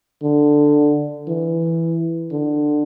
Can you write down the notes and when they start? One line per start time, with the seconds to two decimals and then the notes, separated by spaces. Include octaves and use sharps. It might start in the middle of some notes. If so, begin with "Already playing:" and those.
0.23 D3
1.28 E3
2.32 D3